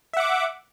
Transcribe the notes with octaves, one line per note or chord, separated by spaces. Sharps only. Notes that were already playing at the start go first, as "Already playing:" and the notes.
E5 F#5 D6